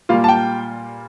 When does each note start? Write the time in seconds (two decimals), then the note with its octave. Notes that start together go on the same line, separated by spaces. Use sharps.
0.09 A#2 G3 A#3 F4 F5
0.24 A5
0.29 G5